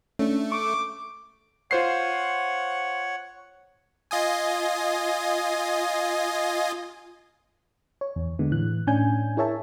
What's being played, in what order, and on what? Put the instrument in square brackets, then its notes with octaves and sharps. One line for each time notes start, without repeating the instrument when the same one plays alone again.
[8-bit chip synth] A3 [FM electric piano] C#4 D4
[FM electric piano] C#6 [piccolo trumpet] D6
[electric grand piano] F4 C5 C7 [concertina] C#5 F#5
[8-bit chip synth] F4 D#5 G#5
[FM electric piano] C#5
E2
D3 G#3 B3
A2 E3 F#6
A2 C#4 D4 G#5 G6
E4 G#4 A#4 C#5 E5 A5